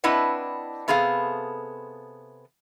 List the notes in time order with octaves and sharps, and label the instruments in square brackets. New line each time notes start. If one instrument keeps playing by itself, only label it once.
[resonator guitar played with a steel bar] C4 D4 E4 B4 D#5 F#5
C3 B3 G#4 A4 F5